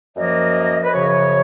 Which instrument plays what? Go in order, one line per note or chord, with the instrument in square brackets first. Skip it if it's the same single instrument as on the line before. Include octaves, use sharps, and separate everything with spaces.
[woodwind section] F#2 F3 A#3 D#5
B4
F#2 C#3 F3 C#5